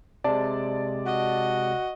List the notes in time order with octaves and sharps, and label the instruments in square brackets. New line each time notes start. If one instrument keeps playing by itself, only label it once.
[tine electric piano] C3 G#3 [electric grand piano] D5 A5
[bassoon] F#4 [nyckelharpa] D#5